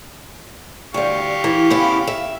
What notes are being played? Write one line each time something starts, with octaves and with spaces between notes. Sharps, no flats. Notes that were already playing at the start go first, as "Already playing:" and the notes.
D2 G3 G4 F5 C#6
E3
C#3 B3 E4
E5